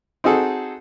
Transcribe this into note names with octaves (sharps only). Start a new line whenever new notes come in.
C4 D#4 F#4 G#4 A4